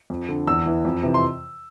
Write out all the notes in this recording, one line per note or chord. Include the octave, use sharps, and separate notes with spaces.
F2
D3
E2 E6
E3
F2
C3 E3
C6